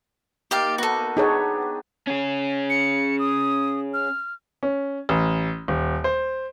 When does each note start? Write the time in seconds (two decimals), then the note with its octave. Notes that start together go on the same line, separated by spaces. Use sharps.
0.51 A#3 D#4 G4 D5 F5
0.78 A#3 B3 F#4 A4
1.17 B3 D4 D#4 G4 G#4 C#5
2.07 C#4 G#4
2.70 C#7
3.19 D#6
3.94 F6
4.63 C#4
5.09 A1
5.68 D#1
6.04 C5